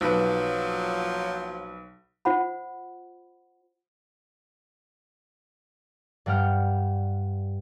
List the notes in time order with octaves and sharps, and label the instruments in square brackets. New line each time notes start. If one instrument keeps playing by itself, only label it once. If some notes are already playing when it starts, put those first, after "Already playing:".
[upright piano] B1 B4 [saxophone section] A#2 F3 F#3
[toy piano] F4 C5 F#5 B5
[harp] G2 G3 F#5 G5 F6